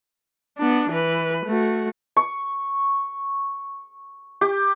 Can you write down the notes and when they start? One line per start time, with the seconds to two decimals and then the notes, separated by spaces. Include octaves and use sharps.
0.58 B3 D4
0.90 E3 B4
1.46 A3 F#4
2.17 C#6
4.41 G4